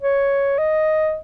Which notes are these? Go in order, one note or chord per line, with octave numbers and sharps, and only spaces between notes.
C#5
D#5